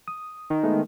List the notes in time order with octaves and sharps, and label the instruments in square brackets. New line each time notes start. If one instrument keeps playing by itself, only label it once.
[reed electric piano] D#6
[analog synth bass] D#3
[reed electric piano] G#3 A3 B3